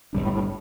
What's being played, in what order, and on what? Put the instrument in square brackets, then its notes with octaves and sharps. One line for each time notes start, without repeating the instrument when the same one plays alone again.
[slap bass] G1 G2 G3 D4
[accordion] A2
A2